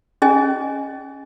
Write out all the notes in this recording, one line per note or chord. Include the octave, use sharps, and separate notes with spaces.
C#4 G#4 D#5 G#5